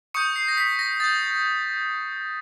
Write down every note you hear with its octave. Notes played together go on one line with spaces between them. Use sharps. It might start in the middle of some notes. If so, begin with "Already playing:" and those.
C#6 D#6 G6 C#7
C7
A#6
B6
A#6
D#6 G6 A6